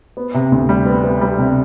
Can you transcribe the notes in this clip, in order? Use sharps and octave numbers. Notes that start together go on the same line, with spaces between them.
B3
C3
D2
G3
B3
B3
G3
C3